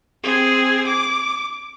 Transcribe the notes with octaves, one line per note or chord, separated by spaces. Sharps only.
C4 G#4
D6